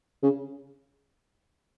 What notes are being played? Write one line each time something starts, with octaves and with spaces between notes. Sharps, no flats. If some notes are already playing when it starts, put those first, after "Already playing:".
C#3